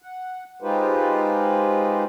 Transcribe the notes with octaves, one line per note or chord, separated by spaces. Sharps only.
F#5
G#3 D#4 F4 G4 B4 C5